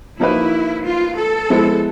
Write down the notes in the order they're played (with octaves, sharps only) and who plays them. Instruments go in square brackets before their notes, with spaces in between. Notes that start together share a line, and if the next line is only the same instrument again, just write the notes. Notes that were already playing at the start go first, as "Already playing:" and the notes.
[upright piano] F3 A#3 D#4 F#4 B4 [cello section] E4
[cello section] F4
A4
[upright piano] F3 G#3 B3 E4